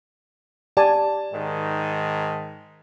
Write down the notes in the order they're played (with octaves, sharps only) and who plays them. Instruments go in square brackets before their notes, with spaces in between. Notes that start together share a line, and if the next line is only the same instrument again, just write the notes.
[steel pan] G4 D5 G#5 [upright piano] A5
[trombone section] G#2 D#3